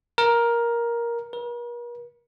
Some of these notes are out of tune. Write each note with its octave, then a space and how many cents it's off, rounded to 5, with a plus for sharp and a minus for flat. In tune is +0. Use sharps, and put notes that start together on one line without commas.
A#4 +10
A#4 +45